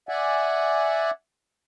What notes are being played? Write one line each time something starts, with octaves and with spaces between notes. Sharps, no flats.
D5 E5 F#5 G#5